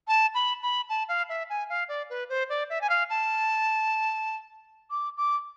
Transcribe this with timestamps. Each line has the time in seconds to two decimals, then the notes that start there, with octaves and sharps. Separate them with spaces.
0.08 A5
0.35 B5
0.63 B5
0.89 A5
1.09 F5
1.29 E5
1.50 G#5
1.70 F5
1.89 D5
2.10 B4
2.29 C5
2.49 D5
2.70 E5
2.81 G#5
2.90 F5
3.10 A5
4.91 D6
5.17 D6